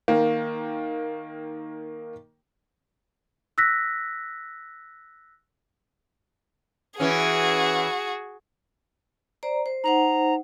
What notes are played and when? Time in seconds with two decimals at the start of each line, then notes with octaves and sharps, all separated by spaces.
0.08 D#3 A#3
3.58 E6 F#6 A#6 B6
7.00 E3 C#4 F#4 G#4
9.43 C5 D5 A#5
9.66 C5
9.84 D#4 C5 F#5 A#5